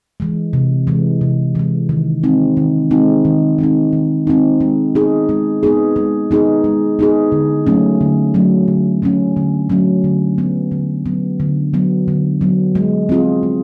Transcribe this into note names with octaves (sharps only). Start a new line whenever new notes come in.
E3 G#3
C3
E3 G#3
C3
E3 G#3
D#3
G#3 C4 D#4
D#3
G#3 C4 D#4
D#3
G#3 C4 D#4
D#3
G#3 C4 D#4
G#3
B3 D#4 G#4
G#3
B3 D#4 G#4
G#3
B3 D#4 G#4
G#3
B3 D#4 G#4
D3
F#3 A3 C#4
D3
F#3 A3 C#4
D3
F#3 A3 C#4
D3
F#3 A3 C#4
D3
F#3 B3
D3
F#3 B3
D3
F#3 B3
D3
F#3 B3
G#3
C4 F4 G#4
G#3